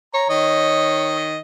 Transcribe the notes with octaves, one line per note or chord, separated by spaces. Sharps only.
C#5 A#5
D#3 D#5